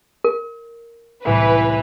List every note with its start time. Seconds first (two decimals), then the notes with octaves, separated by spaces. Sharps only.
0.24 A#4
1.25 C2 A2 E3 B4 E5